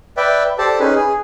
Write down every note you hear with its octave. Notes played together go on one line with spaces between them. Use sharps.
B4 D5 E5 G5
G4 A4 C5 D5 A5
C#4 D#4 G#4 B4
G#4